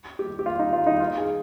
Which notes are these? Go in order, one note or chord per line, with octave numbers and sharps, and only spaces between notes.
G4
G4
F4
D#4
F4
D#4
F4
G#4